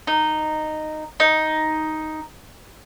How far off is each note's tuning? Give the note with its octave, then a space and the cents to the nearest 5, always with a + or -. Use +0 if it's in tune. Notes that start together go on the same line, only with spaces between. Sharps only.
D#4 -10
D#4 +5